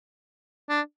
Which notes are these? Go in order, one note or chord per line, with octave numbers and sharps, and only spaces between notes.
D4